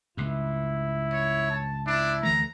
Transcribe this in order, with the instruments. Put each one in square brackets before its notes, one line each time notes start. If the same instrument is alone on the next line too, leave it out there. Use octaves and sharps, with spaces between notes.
[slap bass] C#2 G2 [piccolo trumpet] E4
[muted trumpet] C#5
[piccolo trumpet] A5
[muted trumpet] D4 [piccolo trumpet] E4
[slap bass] D2 E3 A3 [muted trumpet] A#5